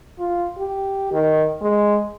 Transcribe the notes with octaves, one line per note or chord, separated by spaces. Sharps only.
F4
G4
D#3
G#3